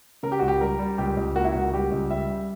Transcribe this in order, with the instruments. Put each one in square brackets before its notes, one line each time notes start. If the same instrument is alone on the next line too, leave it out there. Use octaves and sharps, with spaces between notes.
[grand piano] C#3 A#4
G4
C#2 F#4
G4
G3 A#4
G3
C#2 G4
C#2
A#3 F#4
E4
C#2 F#4
G3 G4
C#2
G3 E5
G3